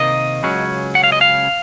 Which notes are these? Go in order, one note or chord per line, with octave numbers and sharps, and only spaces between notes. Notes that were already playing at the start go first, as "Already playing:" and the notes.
Already playing: C3 D#3 A#3 D#5
C#2 C#3 F#3 C#4
F#5
F5
D#5
F5